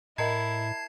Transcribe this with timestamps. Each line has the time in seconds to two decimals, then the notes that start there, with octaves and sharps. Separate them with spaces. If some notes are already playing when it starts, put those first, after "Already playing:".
0.18 A2 E4 A#4 D#5 A5 A#5 G#6 C7